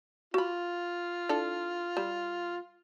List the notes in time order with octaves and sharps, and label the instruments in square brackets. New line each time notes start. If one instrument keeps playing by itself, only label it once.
[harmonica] F4 [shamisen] F#4 B5
[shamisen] D4 E4 A4
G3